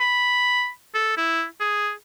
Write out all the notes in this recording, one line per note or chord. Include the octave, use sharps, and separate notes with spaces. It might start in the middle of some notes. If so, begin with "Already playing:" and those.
B5
A4
E4
G#4